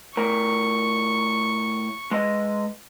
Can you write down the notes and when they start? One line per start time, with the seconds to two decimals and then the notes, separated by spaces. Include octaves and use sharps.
0.17 A2 A#4 C#6
2.11 G#3 B4 D#5